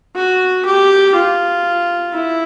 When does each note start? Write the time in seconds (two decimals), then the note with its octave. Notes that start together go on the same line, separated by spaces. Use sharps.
0.16 F#4
0.65 G4
1.15 F4
2.13 E4